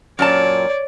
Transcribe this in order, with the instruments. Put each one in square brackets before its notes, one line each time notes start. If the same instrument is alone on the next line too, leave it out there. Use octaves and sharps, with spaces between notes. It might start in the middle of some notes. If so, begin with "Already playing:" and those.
[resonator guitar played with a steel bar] F#2 A#2 A5 [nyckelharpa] C#5 D5